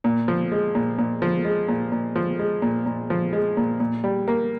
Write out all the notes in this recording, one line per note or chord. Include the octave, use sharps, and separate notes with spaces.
A#2
F3
G#3
A#2
A#2
F3
G#3
A#2
A#2
F3
G#3
A#2
A#2
F3
G#3
A#2
A#2
G3
A#3